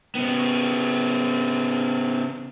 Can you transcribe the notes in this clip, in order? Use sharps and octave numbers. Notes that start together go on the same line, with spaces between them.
C#3 B3